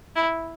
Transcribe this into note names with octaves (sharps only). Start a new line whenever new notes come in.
E4